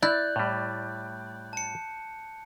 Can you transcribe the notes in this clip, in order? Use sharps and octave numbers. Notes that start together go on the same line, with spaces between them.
E4 D5 F#6 G6
A2 G3
A5 C#7